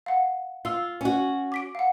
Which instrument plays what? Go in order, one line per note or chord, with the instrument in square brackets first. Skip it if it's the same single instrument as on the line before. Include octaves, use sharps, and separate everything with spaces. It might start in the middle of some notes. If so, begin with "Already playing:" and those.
[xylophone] F5 F#5
[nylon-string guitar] F4 [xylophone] F5 E6
[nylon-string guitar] C#4 F#4
[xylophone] D6 B6 D7
F5 F#5